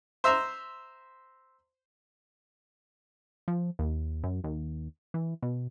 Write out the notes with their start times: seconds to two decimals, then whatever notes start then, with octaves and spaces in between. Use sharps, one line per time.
0.24 C5 E5 A#5 C6
3.48 F3
3.79 D#2
4.24 F#2
4.44 D#2
5.14 E3
5.42 B2